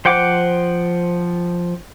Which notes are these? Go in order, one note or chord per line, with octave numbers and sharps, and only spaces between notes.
F3 C5 F#5 G5 D6